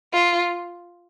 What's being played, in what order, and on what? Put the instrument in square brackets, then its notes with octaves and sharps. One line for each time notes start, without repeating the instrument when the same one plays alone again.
[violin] F4